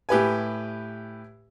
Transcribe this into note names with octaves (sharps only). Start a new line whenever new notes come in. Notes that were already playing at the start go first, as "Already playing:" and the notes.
A2 G4 B4 G#5